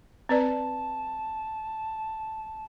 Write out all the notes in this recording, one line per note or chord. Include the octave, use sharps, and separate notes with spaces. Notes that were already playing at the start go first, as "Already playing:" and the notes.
C4 B4 D5 A5